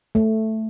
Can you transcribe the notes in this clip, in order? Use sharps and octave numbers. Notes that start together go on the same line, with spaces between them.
A3